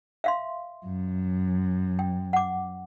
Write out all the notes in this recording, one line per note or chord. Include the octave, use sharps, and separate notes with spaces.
E5 F5 C6
F#2
G5
F#5 D6